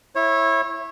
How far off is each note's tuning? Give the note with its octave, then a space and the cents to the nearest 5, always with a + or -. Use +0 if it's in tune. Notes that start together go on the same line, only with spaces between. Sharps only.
E4 +0 C#5 -25